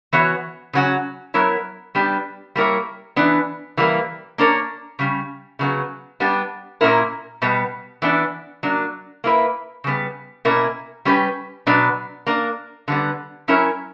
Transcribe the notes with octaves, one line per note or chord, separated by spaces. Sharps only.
E3 B3 F#4 C#5
C#3 F#3 C#4 F#4
F#3 B3 E4 A#4 C#5
G3 B3 D4 G4
G3 A#3 E4 A#4 C#5
E3 B3 D4
E3 G3 A#3
A#3 D4 A#4 C#5
C#3 G3 C#4
C#3 F#3 B3
G3 B3 D4 G4
A#2 A#3 C#4 E4 A#4
B2 G3 B3
E3 B3 D4
F#3 A#3 D4
A#3 E4 B4
C#3 G3 B3
B2 A#3 C#4 E4 A#4
G3 C#4 G4 B4
B2 F#3 B3 D4
A#3 D4 A#4
D3 G3 B3
F#3 C#4 E4 A#4 C#5